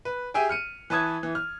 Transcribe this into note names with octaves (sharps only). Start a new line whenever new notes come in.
B4
G4 G#4 E5 G5 G#5
F6 C#7 D#7
E3 B4 A5 D#6 G#6
E3
F6